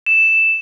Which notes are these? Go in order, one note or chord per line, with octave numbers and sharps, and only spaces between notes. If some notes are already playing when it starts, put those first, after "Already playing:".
E7